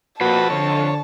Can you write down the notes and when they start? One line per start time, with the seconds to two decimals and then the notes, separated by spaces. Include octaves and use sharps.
0.21 F2 A#2 F#4 B4 A5
0.50 D3 C#5